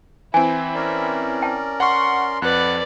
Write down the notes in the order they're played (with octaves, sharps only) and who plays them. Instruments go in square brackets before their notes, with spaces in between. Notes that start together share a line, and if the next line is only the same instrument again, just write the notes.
[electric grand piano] E3 C4 [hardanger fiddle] E4 [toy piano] G#5
[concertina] C#4 A#4 D5
[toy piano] G5 A5
[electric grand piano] F#5 C#6 [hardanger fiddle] C6
[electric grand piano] F2 [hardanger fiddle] B4 D5 [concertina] F#5 F#6